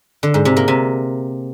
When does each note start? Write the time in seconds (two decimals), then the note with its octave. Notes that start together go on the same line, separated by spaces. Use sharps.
0.23 D3
0.34 G#2
0.45 C3
0.57 A#3
0.68 C3